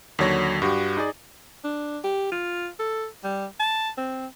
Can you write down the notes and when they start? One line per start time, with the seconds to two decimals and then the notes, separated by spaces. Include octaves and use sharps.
0.19 D#2 D3 F#3 C#5 A#6
0.62 G2 F#4 G4
0.97 D#4 G#4 D5
1.64 D4
2.04 G4
2.32 F4
2.79 A4
3.24 G3
3.60 A5
3.98 C4